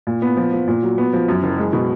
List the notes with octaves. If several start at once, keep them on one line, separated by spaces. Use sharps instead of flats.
A#2
B3
F3
F3
A#2
F#3
B3
F3
F#2
F#1
G#3
B2